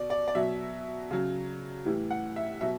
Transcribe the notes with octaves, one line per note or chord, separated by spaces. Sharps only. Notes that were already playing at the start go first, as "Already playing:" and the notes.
Already playing: B2 D5
D5
D5
B2 F#3 E5
C#3 F#3
A2 E3 G3
F#5
E5
B2 F#3 E5